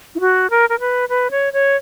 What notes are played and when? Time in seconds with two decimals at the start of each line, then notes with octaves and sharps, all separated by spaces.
0.15 E4
0.20 F#4
0.50 A#4
0.69 A#4
0.80 B4
1.09 B4
1.31 C#5
1.53 C#5